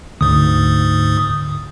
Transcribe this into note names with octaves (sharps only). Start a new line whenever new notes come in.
D2 G#2 D#6